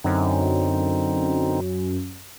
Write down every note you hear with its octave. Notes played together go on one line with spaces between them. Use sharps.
F#2 D3 C4 D#4